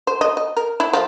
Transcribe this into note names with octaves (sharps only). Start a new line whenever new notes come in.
C5
D#5
D#5
A#4
E4
F3